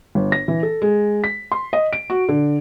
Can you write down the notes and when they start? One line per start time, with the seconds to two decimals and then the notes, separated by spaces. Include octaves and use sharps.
0.15 G1
0.32 A#6
0.48 E3
0.63 A4
0.82 G#3
1.24 B6
1.52 C6
1.73 D#5
1.93 D7
2.10 F#4
2.29 D3